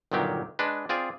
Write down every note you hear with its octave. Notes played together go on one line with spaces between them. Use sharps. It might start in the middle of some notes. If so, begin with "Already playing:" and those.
G1 A#2 D#3 F#3 G4
G#3 D4 B4
C4 F4 G#4 D5